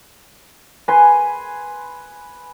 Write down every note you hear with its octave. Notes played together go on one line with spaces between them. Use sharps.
B4 G#5 B5 C6